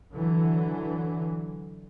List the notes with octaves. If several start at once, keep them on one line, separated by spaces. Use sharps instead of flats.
D3 E3 F#3